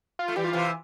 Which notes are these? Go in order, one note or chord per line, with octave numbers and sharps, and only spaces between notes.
F4
A3
E3 G3 G4
F4
C3 E3